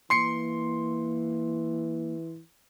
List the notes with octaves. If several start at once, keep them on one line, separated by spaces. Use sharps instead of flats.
E3 A#3 C6 C7 C#7